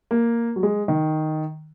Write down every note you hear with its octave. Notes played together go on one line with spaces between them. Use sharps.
A#3
F#3
G#3
D#3